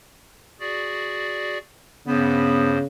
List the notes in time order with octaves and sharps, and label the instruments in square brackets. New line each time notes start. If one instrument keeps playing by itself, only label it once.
[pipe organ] F#4 G#4 D5
[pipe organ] G2 C5 [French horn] C#3 [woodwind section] B3